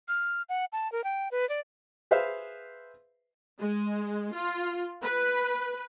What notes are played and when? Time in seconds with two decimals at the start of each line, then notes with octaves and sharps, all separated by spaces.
0.08 F6
0.49 F#5
0.72 A5
0.92 A#4
1.04 G5
1.31 B4
1.49 D5
2.11 G#4 B4 C5 E5 F5
3.59 G#3
4.33 F4
5.03 B4